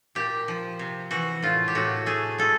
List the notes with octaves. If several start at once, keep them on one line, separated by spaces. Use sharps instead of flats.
A#2 G4
F3
C3
E3 F#4
A2 F4
G4
A2 F#4
A3 G#4
G#3 A4